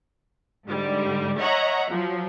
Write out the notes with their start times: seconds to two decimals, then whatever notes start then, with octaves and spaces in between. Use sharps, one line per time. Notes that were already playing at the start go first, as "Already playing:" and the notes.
0.67 G#2 D3 G3
1.39 C#5 D#5 E5 F#5 A#5
1.90 F3 F#3